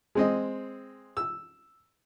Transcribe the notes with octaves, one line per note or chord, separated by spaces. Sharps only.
G#3 C4 D#5
E6